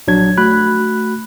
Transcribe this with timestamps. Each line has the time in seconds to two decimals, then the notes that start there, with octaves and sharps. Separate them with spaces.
0.07 A#1 F#3 D4 G#6
0.38 A3 F#4 B5 F#6